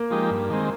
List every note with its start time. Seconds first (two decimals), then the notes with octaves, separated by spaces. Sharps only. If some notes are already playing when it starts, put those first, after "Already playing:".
Already playing: A#3
0.10 F3 G#3 D#4 G4
0.30 G2
0.50 D#3 G#3 C4